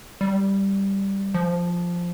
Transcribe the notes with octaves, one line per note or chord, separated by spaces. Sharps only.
G3
F3